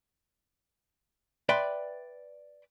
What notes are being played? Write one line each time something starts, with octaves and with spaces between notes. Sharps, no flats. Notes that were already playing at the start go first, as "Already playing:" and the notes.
B4 D5 E5 G5 B5 C6